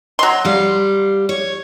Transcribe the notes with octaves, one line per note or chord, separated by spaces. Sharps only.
F#3 C6
G3 F5
C#5